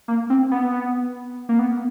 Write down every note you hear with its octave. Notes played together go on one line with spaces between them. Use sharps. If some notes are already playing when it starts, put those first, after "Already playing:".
A#3
C4
B3
A#3
B3